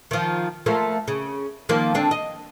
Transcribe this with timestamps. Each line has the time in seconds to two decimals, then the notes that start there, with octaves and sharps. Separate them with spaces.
0.11 D#3 F3
0.66 F3 A3 A#3
1.08 C#3
1.69 D#3 F3 A#3
1.94 D3 C4 D4
2.11 D#5